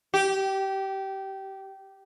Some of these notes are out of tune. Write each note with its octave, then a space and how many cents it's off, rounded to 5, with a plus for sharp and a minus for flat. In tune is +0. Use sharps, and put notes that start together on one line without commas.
G4 -20